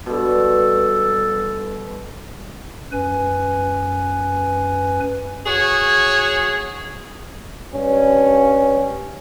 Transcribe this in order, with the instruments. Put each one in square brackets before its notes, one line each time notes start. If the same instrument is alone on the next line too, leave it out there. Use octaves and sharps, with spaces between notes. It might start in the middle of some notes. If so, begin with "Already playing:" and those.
[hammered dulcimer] G2 B2 [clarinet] A4
[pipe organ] F#2 B4 G#5
[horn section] F#4 G#4 C#5
[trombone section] G2 C#4